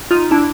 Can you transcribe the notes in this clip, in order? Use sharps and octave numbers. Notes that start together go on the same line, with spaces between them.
D#4 F4
D4 E4